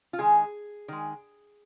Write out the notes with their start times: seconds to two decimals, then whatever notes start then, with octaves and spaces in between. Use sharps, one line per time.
0.13 F4
0.19 D#3 G#3 G#4
0.88 D#3 G#3